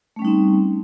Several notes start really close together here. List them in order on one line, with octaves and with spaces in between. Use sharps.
A3 C#4 G3 D#4 C4